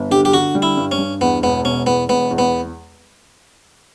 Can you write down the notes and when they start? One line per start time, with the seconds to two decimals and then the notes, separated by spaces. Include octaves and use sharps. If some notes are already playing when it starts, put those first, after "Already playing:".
Already playing: G1
0.11 D3 G4
0.25 G4
0.33 D3 F#4
0.55 G3
0.62 E4
0.77 G2
0.91 C#4
0.99 G2
1.21 E2 B3
1.43 E1 B3
1.65 B2 C#4
1.86 E2 B3
2.09 E1 B3
2.31 E2
2.38 B3